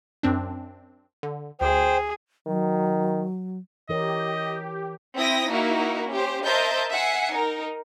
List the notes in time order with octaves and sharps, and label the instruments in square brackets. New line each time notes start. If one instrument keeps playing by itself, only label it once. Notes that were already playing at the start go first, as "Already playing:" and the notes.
[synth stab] F#2 C4 D4
D3
[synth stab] D2 [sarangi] G#4 [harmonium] C5 G5
[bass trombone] D#3 [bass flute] F#3
[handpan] E3 A#4 C#5 [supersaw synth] G4 [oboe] D#5
[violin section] C4 E4 G5 D#6 A#6
A#3 D#4 E4 F#4 A#4
C#4 G4 C5
A#4 C5 D#5 E5 A5 G6
E5 F#5 G#5 C7 C#7
D#4 A#4